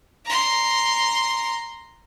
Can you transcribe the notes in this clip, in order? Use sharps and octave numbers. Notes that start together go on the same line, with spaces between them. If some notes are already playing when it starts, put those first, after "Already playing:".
A#5 C6